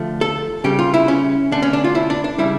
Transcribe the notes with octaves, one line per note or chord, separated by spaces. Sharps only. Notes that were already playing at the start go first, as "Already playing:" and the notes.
Already playing: D3 F3 A3
A4
C#3 G3 G4
F4
E4
C#4
D3 A3 D4
C#4
D4
F4
E4
D4
D4
C#3 G3 E4